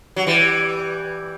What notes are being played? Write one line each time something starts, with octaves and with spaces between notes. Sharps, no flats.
F#3
E3 G3